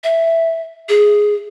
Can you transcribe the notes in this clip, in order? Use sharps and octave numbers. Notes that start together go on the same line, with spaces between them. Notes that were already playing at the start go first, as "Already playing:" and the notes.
E5
G#4